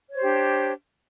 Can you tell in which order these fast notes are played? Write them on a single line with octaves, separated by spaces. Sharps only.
C#5 C5 G4 D4